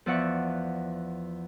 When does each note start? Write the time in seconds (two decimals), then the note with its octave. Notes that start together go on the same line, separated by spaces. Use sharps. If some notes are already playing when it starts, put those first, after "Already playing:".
0.06 E2 F3 D5 E5 F#5 C#6